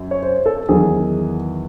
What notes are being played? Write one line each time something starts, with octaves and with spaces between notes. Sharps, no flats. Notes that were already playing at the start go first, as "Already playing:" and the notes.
Already playing: F#2
C#5
C5
A4
E2 D#3 F#3 G#4